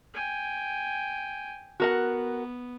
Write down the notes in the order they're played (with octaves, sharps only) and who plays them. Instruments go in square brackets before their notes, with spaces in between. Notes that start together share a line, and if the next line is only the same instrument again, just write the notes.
[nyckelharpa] G5 G#5
[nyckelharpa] B3 [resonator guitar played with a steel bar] F#4 A#4 F#5